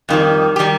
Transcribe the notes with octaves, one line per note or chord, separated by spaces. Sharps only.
F2 D#3 G3
D#3 G3 G4